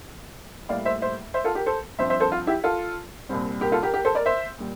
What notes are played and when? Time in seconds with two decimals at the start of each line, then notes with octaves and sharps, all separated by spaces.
0.69 A2 G3 A#3 D5 F5
0.85 C5 E5
1.02 C5 E5
1.34 C5 E5
1.44 F4 A4
1.55 G4 A#4
1.66 A4 C5
1.99 G2 F3 C4 C5 E5
2.10 C5 E5
2.20 A4 C5
2.32 F4
2.47 E4 G4
2.64 F4 A4
3.29 C2 A#2 G3 C4
3.61 G4 A#4
3.72 F4 A4
3.83 G4 A#4
3.94 G4 A#4
4.05 A4 C5
4.15 A#4 D5
4.26 C5 E5
4.58 A#2 G3